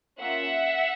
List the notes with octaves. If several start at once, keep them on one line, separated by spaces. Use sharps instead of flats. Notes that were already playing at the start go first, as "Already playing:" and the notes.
A#3 C#4 F4 E5 F#5